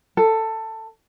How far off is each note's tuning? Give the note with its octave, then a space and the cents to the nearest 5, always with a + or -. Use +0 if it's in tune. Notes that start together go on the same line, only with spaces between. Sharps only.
A4 +15